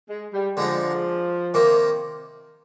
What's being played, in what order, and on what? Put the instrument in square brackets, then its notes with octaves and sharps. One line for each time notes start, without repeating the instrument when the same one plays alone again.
[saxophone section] G#3
G3
[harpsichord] D3 G#3 D#4 [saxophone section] F3
[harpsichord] C3 D#3 A#3